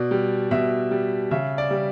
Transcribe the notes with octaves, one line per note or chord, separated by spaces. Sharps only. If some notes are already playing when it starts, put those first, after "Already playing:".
Already playing: B2 D5
G3
B2 E5
G3
C#3 E5
D5
G3